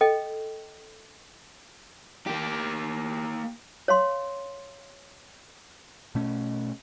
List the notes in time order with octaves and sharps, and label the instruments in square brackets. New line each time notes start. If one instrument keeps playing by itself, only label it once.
[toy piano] A4 D#5 G5
[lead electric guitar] A#3 G4
[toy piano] C#5 F5 C6
[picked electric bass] B2 A3 C#4